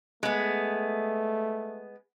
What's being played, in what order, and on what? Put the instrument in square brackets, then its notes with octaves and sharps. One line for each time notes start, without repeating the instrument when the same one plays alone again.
[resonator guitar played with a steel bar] G#3 B3 [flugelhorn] A3